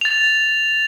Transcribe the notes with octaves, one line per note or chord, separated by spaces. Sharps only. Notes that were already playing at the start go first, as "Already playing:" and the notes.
A6 F7